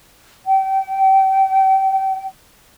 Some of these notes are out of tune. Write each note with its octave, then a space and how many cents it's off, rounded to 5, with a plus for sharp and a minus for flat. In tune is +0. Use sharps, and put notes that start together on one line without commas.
G5 -30